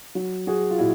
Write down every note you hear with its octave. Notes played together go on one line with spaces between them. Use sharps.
F#3
F#3 F#4 G#4
F4
A#2 E4 F#4